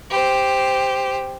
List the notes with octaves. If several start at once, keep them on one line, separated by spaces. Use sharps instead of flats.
G4 C5